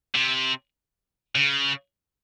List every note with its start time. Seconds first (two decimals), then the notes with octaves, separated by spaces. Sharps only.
0.15 C3
1.35 C#3